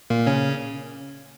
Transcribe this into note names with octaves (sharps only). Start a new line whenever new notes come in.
A#2 A#3
C#3 C#4